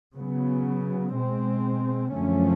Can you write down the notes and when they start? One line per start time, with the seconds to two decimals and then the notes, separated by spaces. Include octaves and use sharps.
0.15 C#3 F#3 B3
1.14 B2 G#3 C4
2.13 F#2 D3 F3 A3 C#4